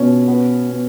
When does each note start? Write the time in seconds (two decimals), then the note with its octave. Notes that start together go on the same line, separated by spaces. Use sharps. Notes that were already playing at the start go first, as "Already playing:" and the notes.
Already playing: B2 B3 C#4
0.28 B3
0.69 B3